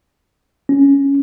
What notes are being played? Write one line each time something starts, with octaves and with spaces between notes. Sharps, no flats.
C#4